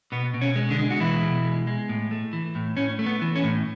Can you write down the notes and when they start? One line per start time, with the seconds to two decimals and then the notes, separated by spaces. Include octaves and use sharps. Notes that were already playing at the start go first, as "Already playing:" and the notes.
0.12 B2 B3
0.34 B2
0.41 C#4
0.56 G#3
0.70 D3 D4
0.79 G#3
0.90 F#4
1.00 B2 E3 E4
1.22 B2
1.45 G#3
1.67 G#3
1.89 A2
2.11 A3
2.33 E3
2.55 A2
2.77 A2 C#4
2.99 A3
3.06 B3
3.22 E3
3.36 C#4
3.44 A2